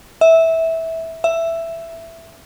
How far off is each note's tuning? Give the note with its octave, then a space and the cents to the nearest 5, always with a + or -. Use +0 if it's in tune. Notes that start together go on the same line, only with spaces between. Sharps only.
E5 -15
E5 +10